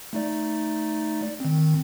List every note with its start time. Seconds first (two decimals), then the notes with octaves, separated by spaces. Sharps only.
0.13 A3 D#4 D5
1.40 D#3 C4